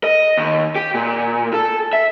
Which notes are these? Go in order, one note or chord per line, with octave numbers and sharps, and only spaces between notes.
D#5
D#2
G4
A#2
A4
E5